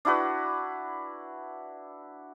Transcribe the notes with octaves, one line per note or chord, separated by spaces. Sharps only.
D4 E4 F#4 B4